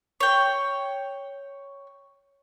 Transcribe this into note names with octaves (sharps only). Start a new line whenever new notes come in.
C#5 G5